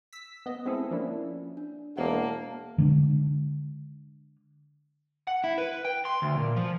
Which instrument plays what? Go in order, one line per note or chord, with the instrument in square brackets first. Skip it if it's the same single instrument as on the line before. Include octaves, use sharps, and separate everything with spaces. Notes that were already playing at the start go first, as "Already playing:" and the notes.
[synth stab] E6 B6
B3 D#5
G#3 B3 C4 E4 G#4 A4
F3 A#3 C#4 D4 E4
[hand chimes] D4
[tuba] E1 [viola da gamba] A#3 [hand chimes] F#5 A5
[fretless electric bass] D3 G#3 D4
[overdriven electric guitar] F#5
E4
B4
G5
C6
D2
A#2
F3